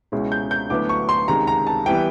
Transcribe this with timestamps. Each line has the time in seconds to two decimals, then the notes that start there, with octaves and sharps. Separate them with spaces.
0.12 C#2 B2 G#3 C#4 E4
0.32 G6
0.51 G6
0.70 D2 D3 F#3 B3 E4 D6
0.89 C#6
1.09 C6
1.28 C#2 C3 D#3 G#3 A#5
1.47 A#5
1.67 A5
1.86 E3 G3 B3 G5